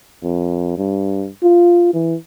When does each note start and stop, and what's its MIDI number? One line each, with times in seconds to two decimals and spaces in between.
0.23 0.76 41
0.77 1.28 43
1.43 1.92 65
1.94 2.15 52